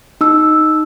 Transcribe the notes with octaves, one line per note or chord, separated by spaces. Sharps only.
D#4 E6